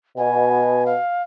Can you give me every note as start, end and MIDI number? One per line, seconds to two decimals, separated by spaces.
0.17 0.93 47
0.17 0.84 80
0.86 1.22 77